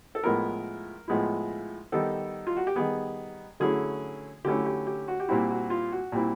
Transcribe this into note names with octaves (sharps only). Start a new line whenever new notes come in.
A4
A2 F3 G#3 B3 E4 A#4
A2 F3 G#3 B3 E4
D#3 G3 B3 A4
F4
F#4
G4
D#3 G3 B3 G#4
D3 F#3 A3 C#4 E4 G#4
D3 F#3 A3 C#4 E4 G4
G4
G4
F#4
G4
A#2 G3 C4 E4 F#4
F#4
F4
F#4
A#2 G3 C4 E4